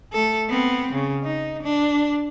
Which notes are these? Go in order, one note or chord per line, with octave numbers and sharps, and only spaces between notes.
A3 A4
B3 C4
C#3
D#4
D4